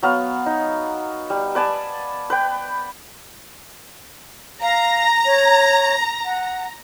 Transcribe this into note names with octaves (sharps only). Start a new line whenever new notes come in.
F#3 B3 F5
D#4
G3
B4 D5 G#5 A5
B4 G5
F5 A#5
C#5
F#5